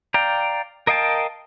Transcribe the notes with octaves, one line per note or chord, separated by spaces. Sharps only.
D5 F5 G5 A#5
A#4 D#5 F5 G5 A5